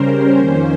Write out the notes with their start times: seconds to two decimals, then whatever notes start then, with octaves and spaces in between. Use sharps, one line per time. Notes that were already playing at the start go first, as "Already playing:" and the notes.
Already playing: C#3 G3 C#4 A#4 C5
0.34 F2 D#3 A#3 C#4 C5